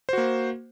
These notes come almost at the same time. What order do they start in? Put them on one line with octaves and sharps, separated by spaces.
C5 F#4 A#3